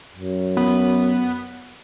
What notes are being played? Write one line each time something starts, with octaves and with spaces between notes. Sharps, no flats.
F#2
B3